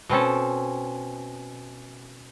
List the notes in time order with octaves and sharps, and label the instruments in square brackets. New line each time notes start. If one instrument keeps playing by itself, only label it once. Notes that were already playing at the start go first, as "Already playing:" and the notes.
[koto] B2 C4 C#4 A4